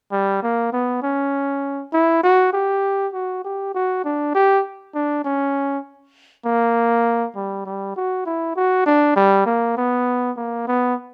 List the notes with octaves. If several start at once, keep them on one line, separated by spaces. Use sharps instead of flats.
G3
A#3
B3
C#4
E4
F#4
G4
F#4
G4
F#4
D4
G4
D4
C#4
A#3
G3
G3
F#4
E4
F#4
D4
G3
A#3
B3
A#3
B3